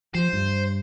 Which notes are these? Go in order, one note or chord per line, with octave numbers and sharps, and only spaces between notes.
F3 C5
G2